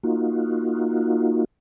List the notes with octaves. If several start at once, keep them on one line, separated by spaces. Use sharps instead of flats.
A#3 D#4 F4 F#4